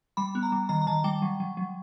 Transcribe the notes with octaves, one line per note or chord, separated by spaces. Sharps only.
G3 B5
B3
A#5
G3
D#3 A#5
A#5
D#3 A5
G3 G5
F#3
F#3
F#3